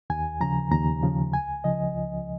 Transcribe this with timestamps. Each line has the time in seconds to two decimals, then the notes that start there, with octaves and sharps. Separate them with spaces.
0.10 D#2 G#5
0.41 C#3 F3 A#5
0.71 D#2 A#5
1.03 C#3 F3
1.33 C#2 G#5
1.64 C#3 F3 D#5
1.95 C#2